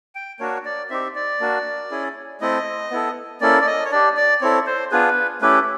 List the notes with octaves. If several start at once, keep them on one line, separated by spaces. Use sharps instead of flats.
G5
A#3 D4 F#4 C#5
D5
C4 D#4 G4 E5
D5
A#3 D4 F#4
C#4 E4 G#4
A3 C4 E4 A4 D#5
B3 E4 A4
A#3 C#4 E4 A4 D5
D5
D#5
C#5
D4 G4 D5
D5
C4 E4 A4 C#5
C5
B3 D4 F4 G#4 B4
A3 C#4 E4 G4 B4